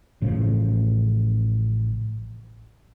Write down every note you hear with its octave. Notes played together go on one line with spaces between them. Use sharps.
A1 A2 C#3 F3